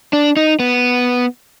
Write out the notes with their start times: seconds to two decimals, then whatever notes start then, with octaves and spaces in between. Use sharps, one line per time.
0.13 D4
0.37 D#4
0.60 B3